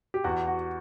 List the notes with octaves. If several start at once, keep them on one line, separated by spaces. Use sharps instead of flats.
G4
E2 F#4
F#4